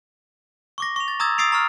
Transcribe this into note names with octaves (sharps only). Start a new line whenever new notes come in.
C#6 D6 A#6
C#6 F7
A6
A#5 D#6 E6 G#6 A6
D#6 E6 A6 C7 D7 F7
A#5 C#6 F6